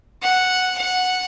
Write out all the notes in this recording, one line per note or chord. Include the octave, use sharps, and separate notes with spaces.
F#5
F#5